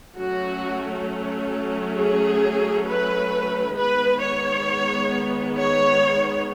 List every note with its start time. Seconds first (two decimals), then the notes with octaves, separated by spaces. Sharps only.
0.16 F#3 A3 C#4 F#4
1.96 G#4
2.87 B4
3.77 D#3 G#3 B3 B4
4.22 C#5
5.57 C#5